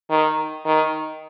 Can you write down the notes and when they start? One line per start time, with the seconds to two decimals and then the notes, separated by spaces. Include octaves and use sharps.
0.10 D#3
0.66 D#3